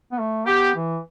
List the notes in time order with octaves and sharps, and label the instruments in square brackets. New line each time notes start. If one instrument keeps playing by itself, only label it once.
[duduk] B3
A3
[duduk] B3 [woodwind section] G4
[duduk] E3